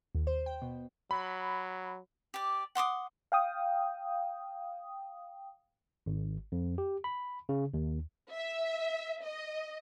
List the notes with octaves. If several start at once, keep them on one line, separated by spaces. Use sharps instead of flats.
D#2
C5
G5
B2
F#3 B5
G4 D5
F#5 C6 D6 D#6
F5 G5 D#6
G#1
F2
G4
B5
C#3
D#2
E5
D#5